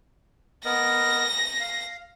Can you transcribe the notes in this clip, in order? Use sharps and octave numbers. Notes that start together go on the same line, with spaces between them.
B3 A#4 D#5 A#6
F5